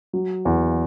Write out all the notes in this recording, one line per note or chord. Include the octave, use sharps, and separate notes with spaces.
F#3
E2